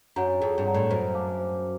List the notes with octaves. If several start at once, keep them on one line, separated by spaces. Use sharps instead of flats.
F#2 C#5 F#5 A#5
F2 G#4
G2
C#5 F#5 A#5
A2
F#2 C5
F5 A5 D6
C5